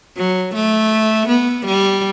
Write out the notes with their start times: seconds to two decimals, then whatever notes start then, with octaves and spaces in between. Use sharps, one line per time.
0.17 F#3
0.54 A3
1.28 B3
1.65 G3